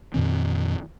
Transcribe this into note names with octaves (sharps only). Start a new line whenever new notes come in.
F2 A#2 D#3 C4